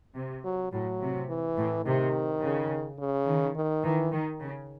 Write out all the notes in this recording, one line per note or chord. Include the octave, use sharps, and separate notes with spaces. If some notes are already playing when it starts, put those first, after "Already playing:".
C3
F#3
A2 F#3
C3
E3
A2
C3 D#3
C#3
C#3
D#3
D#3
D#3 E3
D#3
C#3